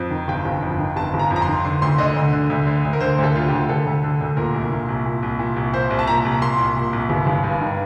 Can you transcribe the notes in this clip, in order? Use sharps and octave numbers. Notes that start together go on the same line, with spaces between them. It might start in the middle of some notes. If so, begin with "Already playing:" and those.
Already playing: F2
D#3
G1 G5
G1
F2
D#3
G1 A5
G1
A#5
F2
A#5
C6
D#3
D3 C6
D2 C6
D3 D#5
D2
D3
D2
D3
D2
A#4
D3 C5
D2 A4
D3 F4
G4
D2
D3 A4
D2
D3
D2
A#2 A#4
C2
A#2
C2
A#2
C2
A#2
C2
A#2 C5
C2
A5
A#2 A#5
C2
A#2 C6
C2
A#2
C2
G1
G1
G2
D#3